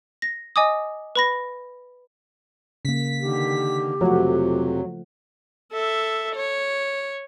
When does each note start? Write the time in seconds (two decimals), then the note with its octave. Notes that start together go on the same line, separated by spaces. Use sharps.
0.22 A#6
0.56 D#5 G#5 D6 D#6
1.16 B4 B5 A#6
2.85 C#3 A#3 B6
3.21 D3 D#3 G4
4.01 F2 C3 F3 F#3 A3 F#5
5.73 A4 E5
6.35 C#5